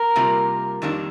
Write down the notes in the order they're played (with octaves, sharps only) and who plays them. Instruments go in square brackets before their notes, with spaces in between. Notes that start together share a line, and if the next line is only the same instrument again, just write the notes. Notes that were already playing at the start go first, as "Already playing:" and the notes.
Already playing: [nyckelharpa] A#4
[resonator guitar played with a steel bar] C3 G3 A#3 F4
F2 D#3 G3 A#3 D4